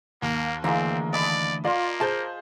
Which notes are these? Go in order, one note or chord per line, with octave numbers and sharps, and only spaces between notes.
D#2 A#3
D2 E3 G#3 A#3 C4 A#5
D5 D#5 A5 B5
A#3 F4 D5 C6
G#4 C5 A5 G6